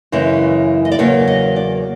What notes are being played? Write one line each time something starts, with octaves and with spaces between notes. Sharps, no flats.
F#2 C#3 E3 G#3 C#4
D#5
D5
E2 C#3 F#3 A#3 C#5
D#5
D5